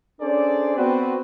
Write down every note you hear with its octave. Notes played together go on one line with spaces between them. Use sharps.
C#4 D4 G#4 A4 C5 D5
B3 C4 F#4 B4